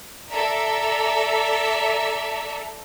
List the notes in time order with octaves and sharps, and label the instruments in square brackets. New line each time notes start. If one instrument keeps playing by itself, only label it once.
[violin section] A4 D5 E5 A#5